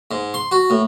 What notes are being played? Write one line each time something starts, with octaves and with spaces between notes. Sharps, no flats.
G#2
C6
F#4
A2